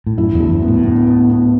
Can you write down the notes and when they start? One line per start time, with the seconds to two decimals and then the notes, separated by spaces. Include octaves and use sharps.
0.07 A2
0.18 F#2 E4
0.34 E2
0.40 D2
0.51 F#2
0.62 B3
0.68 A2
0.84 B3
1.07 B3
1.29 B3